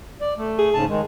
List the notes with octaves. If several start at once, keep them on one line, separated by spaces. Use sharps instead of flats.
D5
A3
G#4
G#2 C#3 A5
D#3 G#3